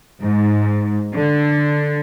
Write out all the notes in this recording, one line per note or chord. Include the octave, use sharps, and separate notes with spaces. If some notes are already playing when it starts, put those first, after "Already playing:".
G#2
D3